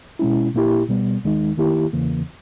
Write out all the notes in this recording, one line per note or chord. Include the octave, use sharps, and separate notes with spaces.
B2 G#3 C#4 E4
A#2 A#3 E4 G4
B2 G3 B3
D#2 D#3 G#3 D#4
D#3 A#3 E4 G4
E2 C#3 E3 A#3